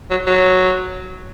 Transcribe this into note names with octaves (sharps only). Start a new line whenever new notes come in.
F#3
F#3